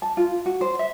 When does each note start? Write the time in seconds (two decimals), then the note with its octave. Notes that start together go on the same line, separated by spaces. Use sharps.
0.02 A5
0.17 F4
0.46 F#4
0.61 C5
0.79 E5